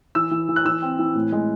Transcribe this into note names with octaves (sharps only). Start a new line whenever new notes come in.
E3 E6
E3
E3
F#6
E3 E6
C4
E3
A2
G#3